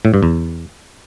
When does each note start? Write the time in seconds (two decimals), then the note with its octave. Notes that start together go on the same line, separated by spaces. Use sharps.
0.05 A2
0.14 G2
0.23 E2